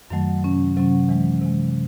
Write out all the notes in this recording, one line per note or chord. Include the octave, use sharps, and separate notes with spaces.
F#2 D#3 F#3 A3
C3 F#3 C#4
C3 F#3 C#4
C3 E3 G#3
C3 E3 G#3